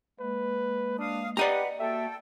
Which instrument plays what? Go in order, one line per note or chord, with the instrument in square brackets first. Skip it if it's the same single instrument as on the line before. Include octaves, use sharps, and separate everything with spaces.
[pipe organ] G#3 A#3 [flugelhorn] B4
[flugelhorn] D4 [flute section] F5 D#6
[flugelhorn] G4 [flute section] B4 F#5 [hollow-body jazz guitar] D5 D#5 A#5
[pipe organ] A#3 F#4 [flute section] A4 G5 [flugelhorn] E5